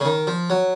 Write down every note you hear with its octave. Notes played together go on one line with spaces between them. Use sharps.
C#3
D#3
F3
F#3